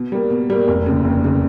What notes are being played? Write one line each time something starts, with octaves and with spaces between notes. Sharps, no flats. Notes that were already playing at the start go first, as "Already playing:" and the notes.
Already playing: B2
G3 A#3
B2
G3 A#3
F1
D#2 C#3
F1
C#3